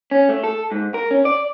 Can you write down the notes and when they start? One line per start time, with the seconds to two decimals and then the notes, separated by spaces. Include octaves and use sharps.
0.11 C#4
0.29 A3
0.44 A4
0.72 G#2
0.94 A#4
1.11 C#4
1.25 D5